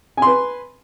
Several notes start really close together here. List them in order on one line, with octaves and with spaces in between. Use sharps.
G#5 C6 B4